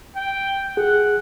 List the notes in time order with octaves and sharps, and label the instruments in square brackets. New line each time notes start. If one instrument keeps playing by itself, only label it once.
[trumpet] G5
[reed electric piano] G#4 [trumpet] F#5